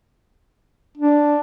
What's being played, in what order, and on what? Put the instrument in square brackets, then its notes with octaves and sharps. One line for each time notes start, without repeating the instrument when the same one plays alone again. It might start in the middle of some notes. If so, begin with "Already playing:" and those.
[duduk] D4